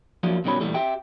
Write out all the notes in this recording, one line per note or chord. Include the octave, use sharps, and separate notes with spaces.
F3 F#3 A#3 D4 E4
B1 B2 D#3 G3 C#4 B5
A#2 E3 G3 A3
G4 E5 G5